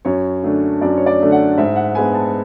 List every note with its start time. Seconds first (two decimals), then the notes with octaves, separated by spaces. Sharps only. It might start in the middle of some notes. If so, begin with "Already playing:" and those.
0.05 F#2 C#5
0.43 D3 A3 D4
0.81 F#2 D5
0.97 C#5
1.06 D5
1.20 D3 A3 D4
1.32 F#5
1.57 G#2 E5
1.76 F#5
1.95 G#3 B3 D4 G#5
2.15 A5